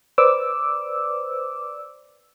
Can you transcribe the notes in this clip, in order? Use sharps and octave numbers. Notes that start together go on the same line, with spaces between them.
B4 C5 D5 D6 E6